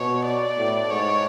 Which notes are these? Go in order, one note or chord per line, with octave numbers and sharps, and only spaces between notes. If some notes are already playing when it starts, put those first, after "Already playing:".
Already playing: B2 C#5
D5
A2
G#2 C#5